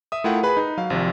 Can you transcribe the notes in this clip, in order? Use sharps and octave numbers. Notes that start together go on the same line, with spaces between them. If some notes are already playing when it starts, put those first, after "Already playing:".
E5 D#6
A3 E4 F4 A#4 F#5 G5
G#4 B4 B5
D#4
F#3 F5
G#1 C3 F3